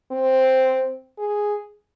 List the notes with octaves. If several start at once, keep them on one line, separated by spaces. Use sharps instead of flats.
C4
G#4